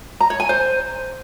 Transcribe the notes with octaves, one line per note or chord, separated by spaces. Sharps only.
A#5
C#5
G#5
C5